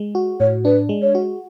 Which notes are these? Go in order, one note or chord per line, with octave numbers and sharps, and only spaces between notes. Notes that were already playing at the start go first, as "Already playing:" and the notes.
Already playing: G#3
F#4
A2 C#5
D4 B4
G#3
C#5
F#4